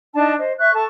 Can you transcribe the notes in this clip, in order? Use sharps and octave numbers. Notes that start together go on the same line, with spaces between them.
D4 D#4 A5
C5 D#5
E5 C#6 F#6
A4 A5 C#6